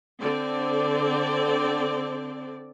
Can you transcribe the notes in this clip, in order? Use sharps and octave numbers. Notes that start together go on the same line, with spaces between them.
D3 C4 D5